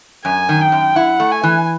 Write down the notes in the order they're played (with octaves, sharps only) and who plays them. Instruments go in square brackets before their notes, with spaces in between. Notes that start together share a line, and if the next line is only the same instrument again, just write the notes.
[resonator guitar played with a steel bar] F#2 [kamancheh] G#5
[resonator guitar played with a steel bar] D#3
[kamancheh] G5
[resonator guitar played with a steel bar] F#2
[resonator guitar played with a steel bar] E4 [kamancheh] F#5
[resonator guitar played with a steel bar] A3
[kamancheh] G#5
[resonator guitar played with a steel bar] E3